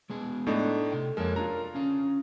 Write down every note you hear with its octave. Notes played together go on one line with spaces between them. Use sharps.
G#3 B3 G#4
A2 A3 D4 D#4
C3 G5
F2 G#3 A#3 A#4 C#5 A5
D4 F4 A#5
C#4 F5